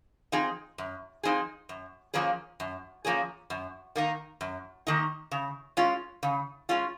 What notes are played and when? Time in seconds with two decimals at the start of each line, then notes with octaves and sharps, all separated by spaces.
0.32 F3 C4 D#4 G#4
0.78 F#2
1.23 F3 C4 D#4 G#4
1.69 F#2
2.14 F3 A#3 C#4 G#4
2.60 F#2
3.05 F3 A#3 C#4 G#4
3.50 F#2
3.96 D#3 A#3 D#4
4.41 F#2
4.87 D#3 A#3 D#4
5.31 C#3
5.77 G#3 C#4 F4
6.23 C#3
6.69 G#3 C#4 F4